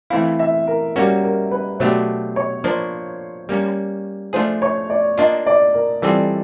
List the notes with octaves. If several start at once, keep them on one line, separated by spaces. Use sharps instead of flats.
E3 A3 C4 E4 F5
E5
A#4
G3 A#3 C#4 F#4 A#4
A#4
B4
B2 F#3 A3 D4 G4 C5
C#5
F3 A#3 D4 C5
G3 A#3 C#4
F3 A3 D4 F4 G#4 C5
C#5
D5
A#3 D4 F4 D#5
D5
A#4
E3 G3 C4 F4 G#4 A4